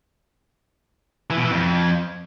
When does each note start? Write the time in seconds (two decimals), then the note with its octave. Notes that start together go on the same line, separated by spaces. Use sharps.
1.30 E3
1.37 B2
1.44 E3
1.51 F2